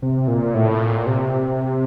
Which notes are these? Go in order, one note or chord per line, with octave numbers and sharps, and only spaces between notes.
C3
A#2
A2
A#2
C3